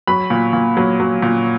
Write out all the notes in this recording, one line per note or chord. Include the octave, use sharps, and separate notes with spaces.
F#3 B5
A#2
A#2
F#3
F#3
A#2